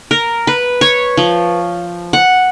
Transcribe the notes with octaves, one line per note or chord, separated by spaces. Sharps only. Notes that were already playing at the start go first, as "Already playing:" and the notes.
A#4
B4
C#5
F3
F#5